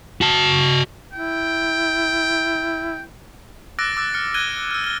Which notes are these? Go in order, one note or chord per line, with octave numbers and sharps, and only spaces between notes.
F#4 A5
E4 G5
D6 E6 F#6 A6 A#6 D7
D6 E6 A6
F6 C#7
F#6 G#6 D#7 G7
E6 F6
F6 G7